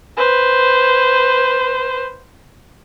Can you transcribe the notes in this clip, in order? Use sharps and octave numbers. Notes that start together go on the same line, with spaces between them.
B4 C5